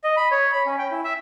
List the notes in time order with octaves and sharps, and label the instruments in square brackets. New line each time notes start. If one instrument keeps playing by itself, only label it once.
[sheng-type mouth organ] D#5
B5
C#5
B5
C#4
G5
E4
E5